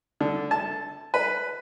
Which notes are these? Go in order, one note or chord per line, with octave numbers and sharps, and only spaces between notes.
D3
A5
B4